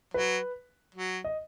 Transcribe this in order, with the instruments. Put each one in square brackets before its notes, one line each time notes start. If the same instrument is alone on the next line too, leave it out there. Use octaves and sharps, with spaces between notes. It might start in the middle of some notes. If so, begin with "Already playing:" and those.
[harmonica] F#3 [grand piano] B4
[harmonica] F#3
[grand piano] D#5